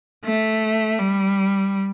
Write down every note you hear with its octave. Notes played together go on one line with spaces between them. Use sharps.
A3
G3